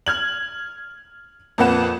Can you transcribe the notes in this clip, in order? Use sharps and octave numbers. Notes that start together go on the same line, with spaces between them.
F6 G#6 F#7
F2 A#2 A#3 B4 F#5 E7